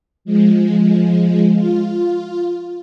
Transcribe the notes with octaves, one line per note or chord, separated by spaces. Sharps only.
F3 G#3
F4